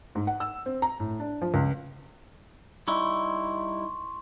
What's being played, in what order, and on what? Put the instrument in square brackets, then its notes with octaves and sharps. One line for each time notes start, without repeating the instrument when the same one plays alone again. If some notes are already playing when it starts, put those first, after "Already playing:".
[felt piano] G#2
F#5
E6
C4
A#5
A2
D4
F3
C#2
[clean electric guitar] G3 D#4 E4 [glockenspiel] C6 C#6